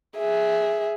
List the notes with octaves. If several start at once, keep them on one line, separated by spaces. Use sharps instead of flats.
G#4 E5